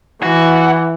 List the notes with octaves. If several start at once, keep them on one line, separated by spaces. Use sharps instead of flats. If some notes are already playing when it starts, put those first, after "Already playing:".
E3 F#4